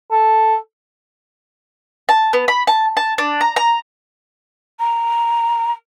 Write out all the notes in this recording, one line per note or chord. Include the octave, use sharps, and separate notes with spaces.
A4
A5
B3
B5
A5
A5
D4
A#5
A#5
A#5